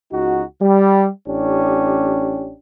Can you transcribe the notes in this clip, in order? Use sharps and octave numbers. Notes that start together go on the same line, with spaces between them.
C#2 D#4 F#4
G3
A1 C#4 D4 G4